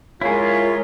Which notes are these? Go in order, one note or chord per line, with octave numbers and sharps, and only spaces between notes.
G#3 E4 F4 G#4 A#4 C#5